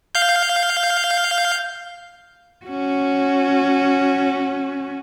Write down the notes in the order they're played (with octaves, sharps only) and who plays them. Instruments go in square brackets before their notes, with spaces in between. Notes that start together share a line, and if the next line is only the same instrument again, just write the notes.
[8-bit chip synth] F5 G6
[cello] C#4 F#4